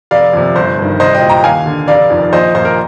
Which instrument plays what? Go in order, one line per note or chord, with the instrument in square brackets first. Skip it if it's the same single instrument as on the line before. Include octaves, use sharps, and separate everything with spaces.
[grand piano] F1 D5 F5
F2 C3
G1 C5
G2 D#3
C2 C5 D#5
D#5 G5
A#2
G5 A#5
D#2 F5 G#5
D3
F1 D5 F5
F2 D#3
A#1 C5 D#5
A#2 C5
A#4